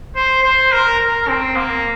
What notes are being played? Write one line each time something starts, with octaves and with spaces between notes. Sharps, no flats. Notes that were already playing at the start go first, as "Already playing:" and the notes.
C5
C5
A#4
A#4
C4
A#3